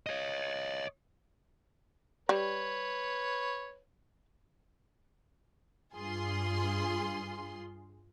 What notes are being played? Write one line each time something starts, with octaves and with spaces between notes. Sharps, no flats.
C#5 D#5
G3 B4 C#5
G2 F4 G#4 C6